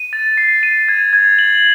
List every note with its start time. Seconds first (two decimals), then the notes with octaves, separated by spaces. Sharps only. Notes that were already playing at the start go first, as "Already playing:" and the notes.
Already playing: D#7
0.13 A6
0.37 C7
0.63 D#7
0.88 G#6
1.13 G#6
1.39 F#7